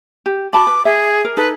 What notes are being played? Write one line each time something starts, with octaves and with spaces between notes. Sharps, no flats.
G4
F#4 A5 B5 D6
B4
G#4 E5
A#4
D#4 A4 B4